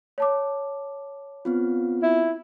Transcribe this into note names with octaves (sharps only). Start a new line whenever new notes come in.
C#5 A5 D6
B3 C4 F4
E4